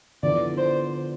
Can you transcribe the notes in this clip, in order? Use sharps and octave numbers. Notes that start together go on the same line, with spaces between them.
D3 F3 B3 E4 D5
C5